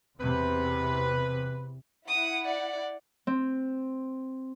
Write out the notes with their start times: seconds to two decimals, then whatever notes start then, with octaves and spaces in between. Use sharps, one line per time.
0.20 E2 C3 B4
2.08 E4 F#5 D#6
2.44 D5
3.27 C4